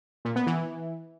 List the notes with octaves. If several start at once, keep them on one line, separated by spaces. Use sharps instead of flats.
A#2
B3
E3